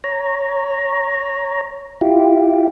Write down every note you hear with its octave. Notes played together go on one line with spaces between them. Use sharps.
C#5 A#5
E4 F4 G4